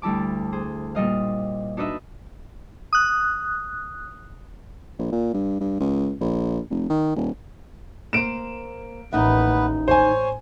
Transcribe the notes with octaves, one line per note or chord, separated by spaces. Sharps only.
D2 G3 E4 A5 D6
G#4 C5
A#2 G3 D#5 F5
D4 D#4 F#4 B4 D#5 E5
D#6 F#6
A#1
A#2
G2
G2
C#2
A#1
F1
D#3
D#1
A#3 C5 D7 E7
A1 D#2 B3 D#4 B4 E5
C5 C#5 G#5